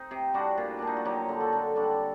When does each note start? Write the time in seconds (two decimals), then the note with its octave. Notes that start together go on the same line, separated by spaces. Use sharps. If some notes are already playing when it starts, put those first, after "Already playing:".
Already playing: C4 D#4
0.11 C3
0.34 G3 D4 F#4
0.58 A#2
0.79 A#2 D4
0.87 D#4
0.97 F#4
1.05 F#3 D#4 G4
1.29 D3
1.40 F#4 A4
1.52 D3
1.76 G3 D4 F#4